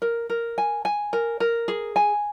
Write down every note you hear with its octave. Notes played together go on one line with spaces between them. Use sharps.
A#4
A#4
G#5
G#5
A#4
A#4
G#4
G#5